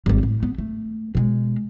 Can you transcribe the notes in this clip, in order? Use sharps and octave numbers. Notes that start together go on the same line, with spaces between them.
G#1 G3
A2
B3
A3
B2 G#3